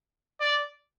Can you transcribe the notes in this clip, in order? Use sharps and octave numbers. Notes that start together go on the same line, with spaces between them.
D5